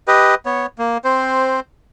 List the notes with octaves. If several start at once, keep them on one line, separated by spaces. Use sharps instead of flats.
G4 B4 D#5
B3 C#5
A#3
C4 C5